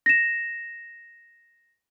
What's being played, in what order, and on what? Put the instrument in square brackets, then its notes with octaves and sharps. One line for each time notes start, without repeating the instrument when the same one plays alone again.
[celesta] A#6 E7